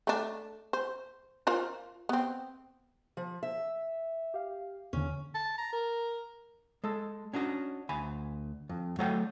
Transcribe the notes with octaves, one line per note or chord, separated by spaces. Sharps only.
A3 D4
C5
F4 A#4 C5
B3 C4
F3
E5
G4 F5
E2 D3 C#4
A5
A#5
A#4
G#3 A4
C#4 D4 F#4 D#5
D2 G#5 B5
F2
F#3 A3 C#5 D#5 F#5 G5